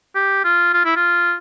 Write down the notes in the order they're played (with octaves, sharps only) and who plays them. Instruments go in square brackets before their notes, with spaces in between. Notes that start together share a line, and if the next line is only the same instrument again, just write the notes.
[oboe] G4
F4
F4
E4
F4